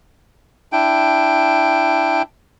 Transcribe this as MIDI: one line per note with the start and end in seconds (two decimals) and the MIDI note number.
0.73 2.22 62
0.73 2.22 64
0.73 2.22 79